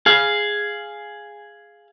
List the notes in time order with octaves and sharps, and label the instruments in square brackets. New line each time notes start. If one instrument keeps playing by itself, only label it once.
[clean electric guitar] G#4 F5